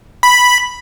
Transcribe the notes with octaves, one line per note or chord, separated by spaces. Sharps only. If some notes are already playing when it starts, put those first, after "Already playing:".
B5